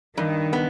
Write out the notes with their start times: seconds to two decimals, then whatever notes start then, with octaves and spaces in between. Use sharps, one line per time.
0.17 G2 D#3
0.53 B3